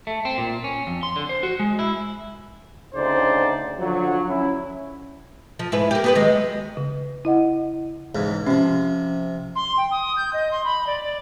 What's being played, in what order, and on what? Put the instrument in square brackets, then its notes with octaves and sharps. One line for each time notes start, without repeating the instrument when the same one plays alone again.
[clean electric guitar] A3
C4
A#2
C#4
F2
C6
D3
C5
F#4
G#3
E4
[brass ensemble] D2 C#3 D#4 C5 D5
D3 F3 F#3
C#4 E4
[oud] F3
G#2 E4 B4
A#3 G4
B3 G4 B4
D#3 F#3 G#3
[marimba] C#3
E4 D#5 F#5
[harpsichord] E2 G#2 C#3
[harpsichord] C3 F3 [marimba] C#4
[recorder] C6
G5
D#6
G6
D#5
C6
B5
D5
D5